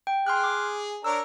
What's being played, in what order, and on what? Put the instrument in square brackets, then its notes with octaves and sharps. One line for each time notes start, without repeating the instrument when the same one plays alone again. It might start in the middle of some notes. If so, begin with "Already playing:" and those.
[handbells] G5
[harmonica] G#4 [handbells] C6 F6 F#6
[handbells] D6
[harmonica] D4 A#4 C#5 [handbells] E6